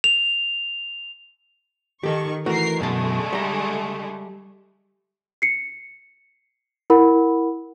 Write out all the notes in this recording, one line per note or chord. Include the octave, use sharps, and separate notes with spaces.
F7
D#3 G4 A4 C#6
E3 A3 F#4 A#4 C7
F#2 B2 D3 G#3 A3 A5
G3 A#5
C7 C#7
E4 A#4 F#5 B5